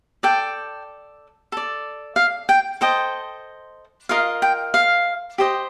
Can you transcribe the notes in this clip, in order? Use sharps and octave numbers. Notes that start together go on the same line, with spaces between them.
A4 D5 G5
A4 D5
F5
G5
A4 C5 D#5 G5
F4 A#4 D#5 F5
G5
F5
G4 C5 D#5